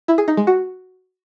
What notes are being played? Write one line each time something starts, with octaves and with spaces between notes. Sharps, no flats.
E4
G#4
D#4
G#3
F#4